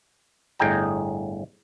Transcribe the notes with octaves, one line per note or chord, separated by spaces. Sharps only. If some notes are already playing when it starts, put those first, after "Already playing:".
G1 A2 G#4 D#5 G5 A#5